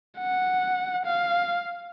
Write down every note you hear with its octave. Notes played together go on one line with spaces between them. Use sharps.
F#5
F5